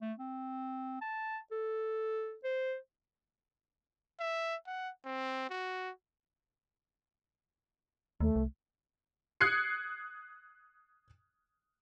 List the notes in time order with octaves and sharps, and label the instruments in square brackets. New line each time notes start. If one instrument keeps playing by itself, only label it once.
[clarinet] A3
C4
A5
A4
C5
[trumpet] E5
F#5
C4
F#4
[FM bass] D#2 [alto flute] A3
[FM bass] C2
[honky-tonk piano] D#6 F#6 G#6 C7 C#7